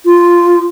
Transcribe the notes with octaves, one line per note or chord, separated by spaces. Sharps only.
F4